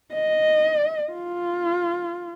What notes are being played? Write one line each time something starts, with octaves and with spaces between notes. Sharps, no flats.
D#5
F4